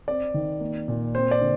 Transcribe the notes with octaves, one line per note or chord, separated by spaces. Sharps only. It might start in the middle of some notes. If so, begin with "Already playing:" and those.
C4 D5
D#3
A#3
A#2
C4 C5
D5
D3